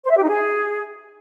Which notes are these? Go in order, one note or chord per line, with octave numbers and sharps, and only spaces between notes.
C5
E5
G4
D#4
G#4